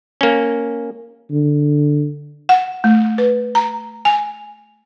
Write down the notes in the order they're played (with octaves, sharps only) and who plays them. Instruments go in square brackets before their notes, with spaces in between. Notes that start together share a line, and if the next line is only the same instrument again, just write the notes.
[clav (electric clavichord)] A#3 C#4
[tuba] D3
[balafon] F#5
A3
B4
A#5
G#5